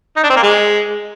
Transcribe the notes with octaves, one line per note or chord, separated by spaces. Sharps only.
D#4
D4
C4
A#3
G#3